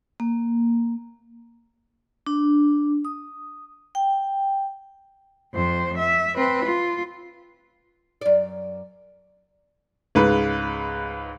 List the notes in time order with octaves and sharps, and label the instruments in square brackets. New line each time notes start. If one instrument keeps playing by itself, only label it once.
[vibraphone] A#3
D4
D#6
G5
[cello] F2 C5
E5
C4 B4
F4
[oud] F#2 D5
[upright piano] C#2 G#2 B4